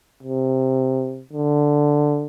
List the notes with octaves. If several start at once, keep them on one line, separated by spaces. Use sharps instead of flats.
C3
D3